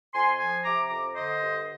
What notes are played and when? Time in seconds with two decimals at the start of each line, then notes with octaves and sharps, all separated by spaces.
0.14 F2 G#5 C6
0.39 F3 G#5 C6
0.64 C3 A#5 D6
0.89 F2 A#5 D6
1.15 D3 C5 D#5
1.41 G2